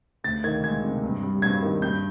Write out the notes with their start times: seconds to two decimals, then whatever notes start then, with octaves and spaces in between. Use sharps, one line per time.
0.24 D2 A6
0.44 D#3 G#6
0.63 G#3 G#6
0.84 C3
1.04 G2
1.23 G3
1.42 G2 G#6
1.63 D#3
1.82 G2 G6